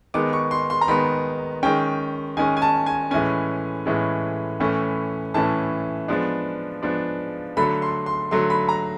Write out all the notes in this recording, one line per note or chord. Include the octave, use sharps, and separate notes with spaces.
D#3 G#3 B3 D6
C#6
C6
C6
A#5
D#3 G#3 B3 B5
D#3 G#3 C#4 G5
D#3 G#3 C#4 G#5
G#5
A5
G#5
A2 E3 G#3 C#4 G#5
A2 E3 G#3 C#4
A2 E3 A3 C#4
A2 E3 A3 C#4 A5
F3 G#3 B3 D4
F3 G#3 B3 D4
D3 F#3 A3 B5
C6
C6
D3 F#3 A3 C6
B5
A#5